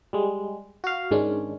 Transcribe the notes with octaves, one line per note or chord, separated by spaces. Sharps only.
G3 G#3
F#4 F5
G#2 D#3 G#3 C#4 D4